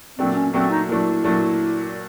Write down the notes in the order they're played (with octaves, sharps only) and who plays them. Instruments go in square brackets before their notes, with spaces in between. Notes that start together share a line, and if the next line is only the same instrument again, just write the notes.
[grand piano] A#2 F#3 A3 D4 [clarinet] C4
[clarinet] C#4
[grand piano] A#2 F#3 A3 D4 [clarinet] C4
[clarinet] D#4
[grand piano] A#2 F#3 A3 D4 [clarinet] E4
[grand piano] A#2 F#3 A3 D4